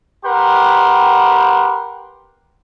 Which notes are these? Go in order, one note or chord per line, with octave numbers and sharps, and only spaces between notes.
G4 A#4 B4 F#5 G5 C6